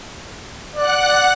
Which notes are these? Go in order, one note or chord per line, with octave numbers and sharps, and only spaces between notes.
D5 F#5 F#6